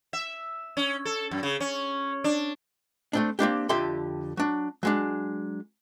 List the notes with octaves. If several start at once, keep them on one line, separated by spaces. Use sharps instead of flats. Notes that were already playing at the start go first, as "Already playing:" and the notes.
E5
C#4
A4
F#2
C#3
C#4
D4
A3 C4 D4
A#3 C4 D4 G4
F2 D3 G4 D5 E5 C6
F#3 D4
F#3 G#3 D4